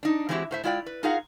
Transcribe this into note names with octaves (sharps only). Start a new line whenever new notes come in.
D4 D#4
E3 G#3 C4 E4 F#4 G4
A2 C5 E5
G#3 E4 F4 D5 G5
B4
D#4 F4 G#4 A#4 F5 F#5